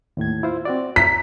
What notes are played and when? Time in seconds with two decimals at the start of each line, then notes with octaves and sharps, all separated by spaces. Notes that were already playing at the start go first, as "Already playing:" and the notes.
0.17 D#2 A2 G#6
0.43 E4 F4 C5
0.65 C4 F#4 D5
0.96 A#5 B6